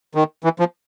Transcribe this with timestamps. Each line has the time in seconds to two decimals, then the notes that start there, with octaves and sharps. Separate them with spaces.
0.15 D#3
0.44 E3
0.59 F3